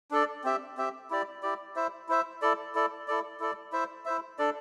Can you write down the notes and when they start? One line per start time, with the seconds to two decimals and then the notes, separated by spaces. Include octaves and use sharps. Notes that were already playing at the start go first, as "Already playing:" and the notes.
0.11 D4 A4 D5
0.44 C4 G4 E5
0.78 C4 G4 E5
1.10 E4 G4 D5
1.42 E4 G4 D5
1.76 E4 C5 E5
2.09 E4 C5 E5
2.42 E4 A4 D5
2.75 E4 A4 D5
3.08 E4 A4 D5
3.40 E4 A4 D5
3.72 E4 C5 E5
4.05 E4 C5 E5
4.38 D4 A4 D5